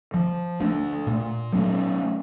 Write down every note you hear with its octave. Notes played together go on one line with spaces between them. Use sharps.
F3
A3 D4
A#2
F#3 A3 C#4